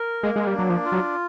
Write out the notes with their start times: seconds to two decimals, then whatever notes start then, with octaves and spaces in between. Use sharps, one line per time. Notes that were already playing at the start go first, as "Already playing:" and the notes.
Already playing: A#4
0.23 G#3 A#3
0.36 G#3
0.47 G3
0.54 F#3 D4
0.70 F3
0.85 F4
0.92 F#3